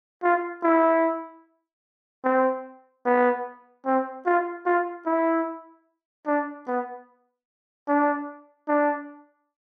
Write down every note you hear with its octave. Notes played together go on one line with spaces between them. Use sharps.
F4
E4
C4
B3
C4
F4
F4
E4
D4
B3
D4
D4